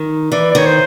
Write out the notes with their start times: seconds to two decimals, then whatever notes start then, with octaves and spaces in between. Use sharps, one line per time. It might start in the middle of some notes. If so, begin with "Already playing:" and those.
Already playing: D#3
0.32 E3 D5
0.51 D5
0.55 D#3 C#5
0.66 C5